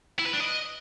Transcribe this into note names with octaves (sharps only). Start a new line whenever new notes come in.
E4
B4
D4
D#5